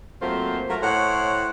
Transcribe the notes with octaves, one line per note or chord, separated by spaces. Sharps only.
F#3 A3 A#3 C4 F4 C5
F#3 A3 F4 A#4
A2 C5 C#5 F#5